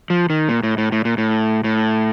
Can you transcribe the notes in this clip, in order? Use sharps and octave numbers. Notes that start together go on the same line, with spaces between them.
F3
D#3
A#2
A2
A2
A2
A#2
A2
A2